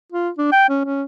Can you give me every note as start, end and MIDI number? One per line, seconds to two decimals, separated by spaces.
0.12 0.29 65
0.38 0.47 62
0.52 0.69 79
0.69 0.80 61
0.85 1.03 61